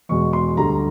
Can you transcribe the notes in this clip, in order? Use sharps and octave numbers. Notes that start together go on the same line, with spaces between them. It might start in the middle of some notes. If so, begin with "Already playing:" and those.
E2 B2 G#3 C#6
C6
D2 D3 G3 A#5